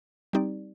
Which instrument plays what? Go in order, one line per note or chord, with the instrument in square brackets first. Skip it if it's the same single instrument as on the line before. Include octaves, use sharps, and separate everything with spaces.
[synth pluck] G3 C4 D#4 G4 D5